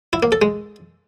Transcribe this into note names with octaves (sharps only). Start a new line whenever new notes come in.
E4
A#3
A4
G#3